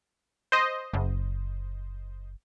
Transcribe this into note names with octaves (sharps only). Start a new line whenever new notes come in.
C5 D#5
F#1